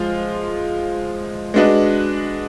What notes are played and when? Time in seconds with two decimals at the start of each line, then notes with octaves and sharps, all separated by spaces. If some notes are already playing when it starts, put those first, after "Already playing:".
Already playing: F3 G#3 F4
1.54 G#3 D4 F#4 B4 D#5